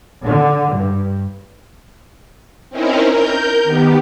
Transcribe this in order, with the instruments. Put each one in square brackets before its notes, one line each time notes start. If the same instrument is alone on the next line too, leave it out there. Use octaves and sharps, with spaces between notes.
[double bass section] D3
G2
[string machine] C4 C#4 D#4 E4 A#4
A#4 G6
D#3 B3 G4